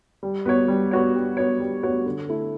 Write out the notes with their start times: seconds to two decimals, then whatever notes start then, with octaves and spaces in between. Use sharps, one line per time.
0.23 G3
0.45 B3 F#4 C#5
0.68 G3
0.91 B3 F#4 C#5
1.14 G3
1.37 B3 F#4 C#5
1.60 G3
1.83 B3 F#4 C#5
2.06 D3
2.29 A3 E4